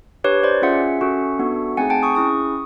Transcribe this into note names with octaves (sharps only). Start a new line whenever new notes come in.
D4 G4 B4 C#5
C5 D5
C#4 F4 G#4 E5 F#5
C#4 F#4 A4
B3 D4 F#4 A4
A3 C4 D#4 G#4 F#5 G#5
G5 A5
C#6 D#6
C#4 E4 G#4 C#6 D#6